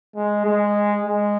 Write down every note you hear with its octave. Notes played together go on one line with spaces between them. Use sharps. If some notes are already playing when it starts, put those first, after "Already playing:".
G#3
G#3
G#3